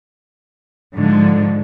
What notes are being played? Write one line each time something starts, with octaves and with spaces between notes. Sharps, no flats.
G#2 D3 F3